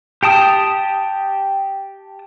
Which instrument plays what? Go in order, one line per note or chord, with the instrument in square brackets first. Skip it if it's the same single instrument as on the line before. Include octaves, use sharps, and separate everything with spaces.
[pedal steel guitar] G4 G5 A5 D#6